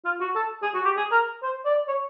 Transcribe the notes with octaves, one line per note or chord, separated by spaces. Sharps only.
F4
F#4
A4
G#4
F#4
G4
G#4
A#4
C5
D5
C#5